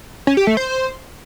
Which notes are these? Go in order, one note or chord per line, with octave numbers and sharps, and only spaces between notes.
C#4
G4
A3
C5